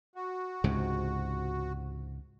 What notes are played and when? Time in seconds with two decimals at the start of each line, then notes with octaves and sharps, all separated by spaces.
0.15 F#4
0.64 C#2 G#2 C3